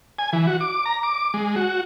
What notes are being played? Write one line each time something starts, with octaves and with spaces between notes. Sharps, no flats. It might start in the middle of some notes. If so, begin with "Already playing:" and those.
G#5
E3
F#4
D6
A#5
D6
G#3
F#4